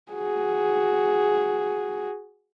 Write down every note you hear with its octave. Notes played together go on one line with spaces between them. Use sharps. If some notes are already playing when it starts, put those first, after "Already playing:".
F#4 G#4